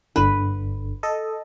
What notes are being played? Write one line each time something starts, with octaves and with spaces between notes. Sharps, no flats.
G1 D3 B4
A4 D#5